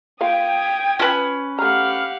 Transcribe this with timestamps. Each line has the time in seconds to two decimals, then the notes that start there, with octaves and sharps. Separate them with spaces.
0.21 A#3 F4 F5 G5 D#6 G#6
0.99 C#4 F4 B4 A5
1.59 A3 G4 F5 F#5 A#5 F6